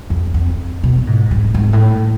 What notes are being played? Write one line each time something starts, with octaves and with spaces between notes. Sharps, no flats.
F2
F2
B2
G#2
G#2
G#2
A2